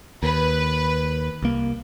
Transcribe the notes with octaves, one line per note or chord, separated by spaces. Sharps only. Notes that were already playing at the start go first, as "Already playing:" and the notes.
D#2 B4
C2 A#3